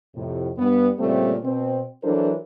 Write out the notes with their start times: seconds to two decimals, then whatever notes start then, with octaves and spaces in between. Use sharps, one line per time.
0.15 F2 A2 C3
0.58 G2 B3
0.99 A#2 C#3 G3 A3 C4
1.43 B2 C4
2.03 E3 F#3 D4 A4 A#4 C5